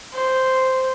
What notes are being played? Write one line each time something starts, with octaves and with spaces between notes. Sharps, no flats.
C5